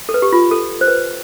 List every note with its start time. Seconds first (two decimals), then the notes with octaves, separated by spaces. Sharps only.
0.09 A4
0.14 B4
0.22 G4
0.33 F4
0.51 A4
0.81 C5
0.88 B4